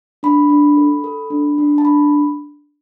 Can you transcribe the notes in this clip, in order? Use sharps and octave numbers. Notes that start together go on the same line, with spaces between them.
D4 B5
D4
A4
A4
D4
D4
A5
D4 B5